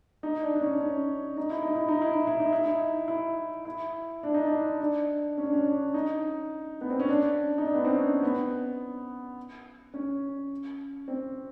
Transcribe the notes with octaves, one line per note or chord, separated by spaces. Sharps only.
D#4
D4
D4
C#4
C#4
D#4
E4
D#4
E4
D#4
E4
D#4
E4
D#4
E4
D#4
E4
E4
D4
D#4
D4
D4
C#4
D4
C#4
D4
D#4
B3
C4
C#4
D4
D#4
D4
B3
C4
C#4
B3
C#4
C4